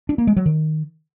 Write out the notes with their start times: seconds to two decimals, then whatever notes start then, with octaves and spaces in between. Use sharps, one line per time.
0.09 D4
0.18 A#3
0.27 G#3
0.36 F#3
0.46 D#3